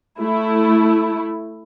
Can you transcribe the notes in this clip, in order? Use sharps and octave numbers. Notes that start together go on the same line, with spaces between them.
A3 E4